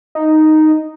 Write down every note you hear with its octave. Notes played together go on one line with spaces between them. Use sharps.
D#4